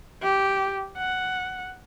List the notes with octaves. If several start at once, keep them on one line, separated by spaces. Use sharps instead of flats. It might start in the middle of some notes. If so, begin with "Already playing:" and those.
G4
F#5